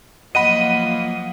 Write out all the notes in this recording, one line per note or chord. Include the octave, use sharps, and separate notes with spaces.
F3 F#3 A#3 D#5 F#5 B5 D#7